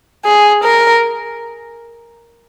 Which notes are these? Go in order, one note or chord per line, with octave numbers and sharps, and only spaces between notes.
G#4
A#4